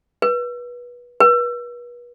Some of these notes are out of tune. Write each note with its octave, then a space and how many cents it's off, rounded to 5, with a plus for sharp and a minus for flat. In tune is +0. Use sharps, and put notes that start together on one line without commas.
B4 -25
B4 -40